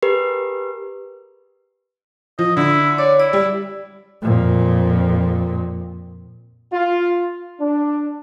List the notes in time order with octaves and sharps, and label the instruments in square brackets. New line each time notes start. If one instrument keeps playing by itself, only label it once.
[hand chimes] G4 G#4 A#4 B4
[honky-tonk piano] F3 [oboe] D#5
[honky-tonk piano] D3 [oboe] E4
[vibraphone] C#5 [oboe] D5
[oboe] E4 [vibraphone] D5
[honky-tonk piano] G3
[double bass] F2 A#2
[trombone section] F4
D4